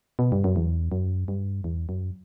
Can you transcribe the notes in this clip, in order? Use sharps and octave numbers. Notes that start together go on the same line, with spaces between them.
B2
G2
F#2
E2
F#2
G2
E2
F#2